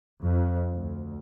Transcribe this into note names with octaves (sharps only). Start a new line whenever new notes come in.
F2
D2